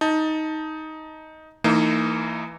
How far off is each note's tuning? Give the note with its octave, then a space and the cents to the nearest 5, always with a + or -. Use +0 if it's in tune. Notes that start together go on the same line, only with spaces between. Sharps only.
D#4 +10 A5 +15
E3 +0 A#3 -35 D#4 +0